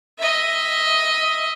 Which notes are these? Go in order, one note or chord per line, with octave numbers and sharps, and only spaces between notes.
D#5 E5